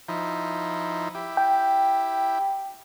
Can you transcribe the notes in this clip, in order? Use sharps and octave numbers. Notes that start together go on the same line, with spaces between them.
F3 D#4 E4
E4 G4
G5